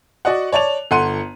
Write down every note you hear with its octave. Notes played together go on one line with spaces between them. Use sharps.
F#4 D5 D#5 F#5
C#5 D5 A5 F7
G1 A4 F#5 C6 D#7